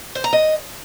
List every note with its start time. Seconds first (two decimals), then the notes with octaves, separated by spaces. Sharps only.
0.15 C5
0.24 A#5
0.33 D#5